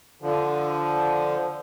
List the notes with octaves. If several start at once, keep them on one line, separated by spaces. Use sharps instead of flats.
D3 F3